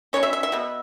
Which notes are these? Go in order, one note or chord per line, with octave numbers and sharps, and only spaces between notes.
B2 F#3 C#4 C#5
E5
E5
E5
B2 B3